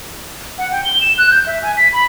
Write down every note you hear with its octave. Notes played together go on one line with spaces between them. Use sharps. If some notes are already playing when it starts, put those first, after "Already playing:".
F#5
G5
G7
E7
F#6
G6
E5
G#5
B6
B5